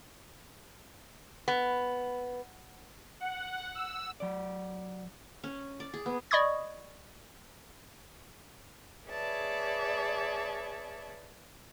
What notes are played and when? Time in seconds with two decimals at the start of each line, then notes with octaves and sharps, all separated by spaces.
1.48 B3
3.20 F#5
3.75 E6
4.20 F#3 D5
5.44 C#4
5.80 D5
5.94 G#4
6.06 B3
6.31 D5 D#5 B5 C#6 D#6 G#6
9.08 G#4 B4 C#5 D5 E5 A5